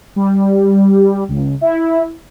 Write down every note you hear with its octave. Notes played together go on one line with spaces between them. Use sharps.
G3
C#2
E4